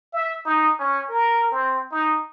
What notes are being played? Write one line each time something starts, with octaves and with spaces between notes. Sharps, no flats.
E5
D#4
C#4
A#4
C4
D#4